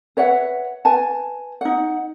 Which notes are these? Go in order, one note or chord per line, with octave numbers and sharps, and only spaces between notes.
B4 C#5 E5 F#5
B4 G#5 A5
D#4 F#5